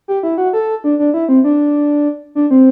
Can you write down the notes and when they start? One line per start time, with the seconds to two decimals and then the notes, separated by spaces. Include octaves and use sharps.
0.08 G4
0.23 E4
0.38 F#4
0.53 A4
0.84 D4
0.99 D4
1.14 E4
1.29 C4
1.44 D4
2.35 D4
2.51 C4